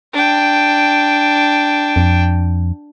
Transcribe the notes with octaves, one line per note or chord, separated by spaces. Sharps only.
D4 G5
F2